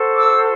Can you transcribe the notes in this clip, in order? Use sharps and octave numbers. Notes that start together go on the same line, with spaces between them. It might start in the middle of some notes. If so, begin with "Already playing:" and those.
Already playing: F#4 A4 C5
D6 E6